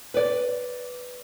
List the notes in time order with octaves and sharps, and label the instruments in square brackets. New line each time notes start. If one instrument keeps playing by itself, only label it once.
[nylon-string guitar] B4 D5